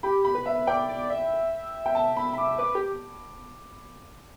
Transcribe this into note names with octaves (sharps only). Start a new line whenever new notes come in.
G4 B5
B5
B4
E5
D5 G5
D5
E5
G5
A5
B5
B5
D6
B4 D6
G4